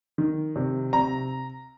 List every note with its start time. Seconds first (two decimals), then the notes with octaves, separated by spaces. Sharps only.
0.18 D#3
0.56 C3
0.93 C3 A#5